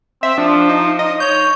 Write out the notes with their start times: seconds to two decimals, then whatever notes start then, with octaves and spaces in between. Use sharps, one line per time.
0.23 C4 E5
0.38 F3 D4
0.69 D#4
0.99 D#5
1.20 C#5 G6